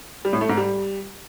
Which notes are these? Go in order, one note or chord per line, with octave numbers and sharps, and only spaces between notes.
G3
A2
A3
G#2
G3